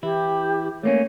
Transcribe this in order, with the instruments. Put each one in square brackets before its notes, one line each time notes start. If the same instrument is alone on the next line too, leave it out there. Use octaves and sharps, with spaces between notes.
[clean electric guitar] E3 E4 [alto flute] G4
[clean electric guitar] A3 A#3 C#4 [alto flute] C#5